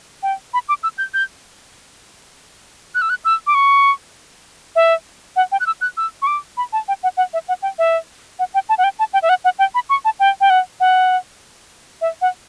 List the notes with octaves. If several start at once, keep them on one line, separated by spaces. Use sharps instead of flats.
G5
B5
D6
E6
G6
G6
F#6
E6
F#6
E6
D6
C#6
E5
F#5
G5
F#6
E6
F#6
E6
C#6
D6
B5
A5
G5
F#5
F#5
E5
F#5
G5
E5
F#5
G5
A5
F#5
G5
A5
G5
E5
F#5
F#5
G5
B5
C#6
A5
G5
G5
F#5
F#5
E5
F#5